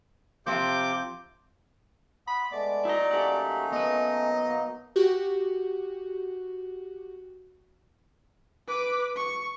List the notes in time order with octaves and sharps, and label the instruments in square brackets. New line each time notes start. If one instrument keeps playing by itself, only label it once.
[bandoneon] C3 D6 G6 [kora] F3 C4 F4
[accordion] F#5 C6 D#6 [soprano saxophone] B5
[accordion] G#3 A3 B3 [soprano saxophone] D5
[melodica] F#3 D#4 [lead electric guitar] E4 D#5
[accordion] A3 A#3 C#4 [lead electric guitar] G4 F#5
[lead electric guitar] B3 B4 [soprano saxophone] D#5
[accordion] B2 A#3
[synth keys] F#4 G4
[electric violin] B4 D6
C#6